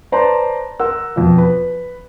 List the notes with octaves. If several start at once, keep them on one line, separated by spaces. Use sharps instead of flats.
B4 C5 D5 A5 A#5 C6
A#4 F#5 C6 E6
F2 B2 F3
B4